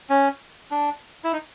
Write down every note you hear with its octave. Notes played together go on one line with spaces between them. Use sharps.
C#4
D4
E4
D#4